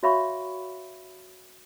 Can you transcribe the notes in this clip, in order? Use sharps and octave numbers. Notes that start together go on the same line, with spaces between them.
F#4 C#5 E5 F5 B5 C#6